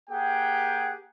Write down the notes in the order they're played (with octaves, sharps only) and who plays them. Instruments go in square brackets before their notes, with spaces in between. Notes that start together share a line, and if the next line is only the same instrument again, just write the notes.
[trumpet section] A#3 G4 G#4 F#5 G5